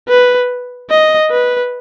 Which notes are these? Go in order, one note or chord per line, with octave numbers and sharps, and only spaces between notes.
B4
D#5
B4